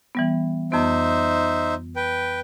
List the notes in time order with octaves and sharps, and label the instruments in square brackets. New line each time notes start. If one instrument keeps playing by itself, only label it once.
[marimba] E3 G3 B3
[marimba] F2 B3 [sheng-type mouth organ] D#4 C5 E5
[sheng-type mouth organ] B4 G5